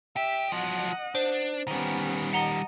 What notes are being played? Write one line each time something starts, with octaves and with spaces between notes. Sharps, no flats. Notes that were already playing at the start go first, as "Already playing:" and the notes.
G4 E5
F3 F#3 D#5 F#5
D4 C5
D#3 G3 B3 C#4
D#5 F#5 A5 A#5 G7